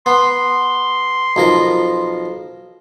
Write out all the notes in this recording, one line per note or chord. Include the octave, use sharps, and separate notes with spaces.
B3 C6
B1 F3 A#4